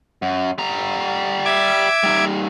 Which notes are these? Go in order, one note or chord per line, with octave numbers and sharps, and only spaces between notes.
F#2
G3 A#5
E5 D6 G#6
G3 D#4